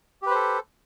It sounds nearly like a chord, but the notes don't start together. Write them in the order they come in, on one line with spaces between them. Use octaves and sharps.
G4 B4 C5 A4